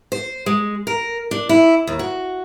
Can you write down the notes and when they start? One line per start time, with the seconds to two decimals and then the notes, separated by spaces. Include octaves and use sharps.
0.12 C5
0.46 G#3
0.87 A#4
1.31 D4
1.49 E4
1.87 D#2
1.99 F#4